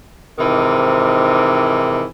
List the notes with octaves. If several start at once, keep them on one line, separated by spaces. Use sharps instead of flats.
G#2 C3 D#3 E3